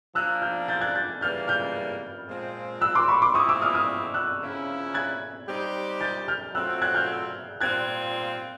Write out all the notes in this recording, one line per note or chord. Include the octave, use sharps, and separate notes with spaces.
F3 A#3 D4 E6 F#6
F6 G6
G6 A6
F#6 G#6
G6 A6
C#3 E3 G3 A#3 F6 G6
F6 G6
A#2 F3 G#3 C4
E6 F#6
C6 D6
B5 C#6
C6 D6
F3 G#3 C4 E4 C#6 D#6
D6 E6
D#6 F6
D#6 F6
E6 F#6
C#3 F3 A#3 C#4 E4
F#6 G#6
G3 C4 D#4 G4
G6 A6
F6 G6
F#3 A3 C4 F4 E6 F#6
F#6 G#6
F6 G6
A#2 G3 C4 F4 F#6 G#6